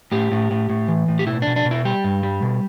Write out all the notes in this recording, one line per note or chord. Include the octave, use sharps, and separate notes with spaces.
A2 G4
A2
A2
A2
E3
A2
G4
B2 E4
B2 D4
D4
B2
E4
G3 G4
G2
G3
B2